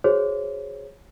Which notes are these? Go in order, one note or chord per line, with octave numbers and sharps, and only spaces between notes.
F#4 G#4 C5 C#5